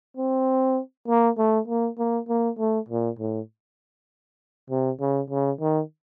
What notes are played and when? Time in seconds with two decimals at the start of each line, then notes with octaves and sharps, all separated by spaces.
0.17 C4
1.08 A#3
1.38 A3
1.68 A#3
1.98 A#3
2.29 A#3
2.58 A3
2.88 A#2
3.19 A2
4.70 C3
5.00 C#3
5.30 C#3
5.60 D#3